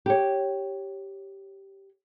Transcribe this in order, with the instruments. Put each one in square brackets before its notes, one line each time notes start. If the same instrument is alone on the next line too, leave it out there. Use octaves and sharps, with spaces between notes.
[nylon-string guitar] G4 C#5